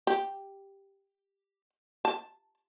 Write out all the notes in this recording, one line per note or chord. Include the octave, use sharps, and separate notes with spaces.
G4
A5